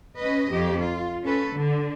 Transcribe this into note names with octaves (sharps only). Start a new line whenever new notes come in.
C#4 B4 D#5
F2 G4
F4
C#4 A4 B4
D3